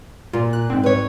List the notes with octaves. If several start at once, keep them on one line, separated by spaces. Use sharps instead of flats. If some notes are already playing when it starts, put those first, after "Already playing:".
A#2 F4
F#6
G#2 C4
B4 C#5